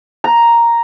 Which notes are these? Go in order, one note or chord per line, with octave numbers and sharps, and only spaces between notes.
A#5